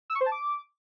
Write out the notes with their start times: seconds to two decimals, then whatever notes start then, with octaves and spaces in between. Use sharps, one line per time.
0.10 E6
0.15 C#6
0.21 C5
0.26 A5
0.32 D6